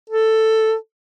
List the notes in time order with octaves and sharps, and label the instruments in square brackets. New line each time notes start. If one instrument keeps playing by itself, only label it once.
[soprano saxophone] A4